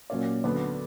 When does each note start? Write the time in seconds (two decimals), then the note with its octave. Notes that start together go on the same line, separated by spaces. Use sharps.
0.10 A#2 F#3 A#3 C#4 D5
0.44 D2 D3 F#3 B3 D5